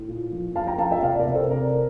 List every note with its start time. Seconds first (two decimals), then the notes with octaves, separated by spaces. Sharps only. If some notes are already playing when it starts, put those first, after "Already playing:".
Already playing: A2
0.08 A#2
0.32 F3
0.56 F3 F5 A5
0.67 G5 A#5
0.79 F3 F5 A5
0.91 E5 G5
1.02 C3 D5 F5
1.19 A#4 D5
1.27 C3
1.34 A4 C5
1.50 C3 A#4 D5